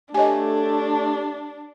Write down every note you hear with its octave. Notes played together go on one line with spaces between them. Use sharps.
A3 D4 G4 C#5 D#5 G#5